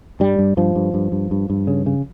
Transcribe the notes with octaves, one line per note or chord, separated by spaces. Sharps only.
G2 G3
G2
G2 F3
G2
G2
G2
G2
G2
C#3
C#3